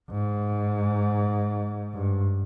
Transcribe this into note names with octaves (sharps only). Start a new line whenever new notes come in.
G#2
G2